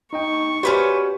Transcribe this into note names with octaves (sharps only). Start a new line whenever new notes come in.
D#4 D#5 G5 C#6
C#4 F#4 G4 B4 C5 D5